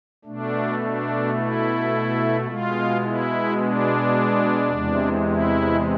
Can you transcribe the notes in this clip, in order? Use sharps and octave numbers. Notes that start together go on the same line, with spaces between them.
B2 A3 D4
D4
E4
B2 G#3 F4
E4
D4
E2 C3 G#3
E4